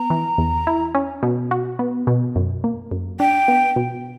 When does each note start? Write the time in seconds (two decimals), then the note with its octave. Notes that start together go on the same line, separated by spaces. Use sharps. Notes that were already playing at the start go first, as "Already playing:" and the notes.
Already playing: B3 A#5
0.10 E3
0.38 E2
0.67 E4
0.95 C#4
1.23 B2
1.51 F#4
1.79 B3
2.07 B2
2.36 F#2
2.64 A#3
2.91 F#2
3.20 D4 G5
3.48 B3
3.76 B2